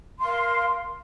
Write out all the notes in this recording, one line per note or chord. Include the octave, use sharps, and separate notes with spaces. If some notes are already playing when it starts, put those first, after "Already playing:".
A#4 F5 C6